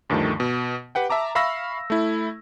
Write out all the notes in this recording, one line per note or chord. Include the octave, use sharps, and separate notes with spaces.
D2 G2 D#3 F3 A3 A5
B2
G4 B4 F#5 G5
E5 A5 A#5 D6
E5 F5 B5 C#6 E6 A#6
A3 E4